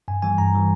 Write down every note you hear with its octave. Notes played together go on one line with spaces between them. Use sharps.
G2 G#5
E3 G3 G#5
G2 A#5
E3 G3